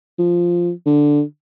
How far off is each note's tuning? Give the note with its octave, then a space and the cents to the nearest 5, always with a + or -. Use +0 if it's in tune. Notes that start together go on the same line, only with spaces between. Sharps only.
F3 -5
D3 +0